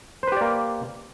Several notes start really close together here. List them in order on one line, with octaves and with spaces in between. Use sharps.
C5 B4 G4 D5 A#3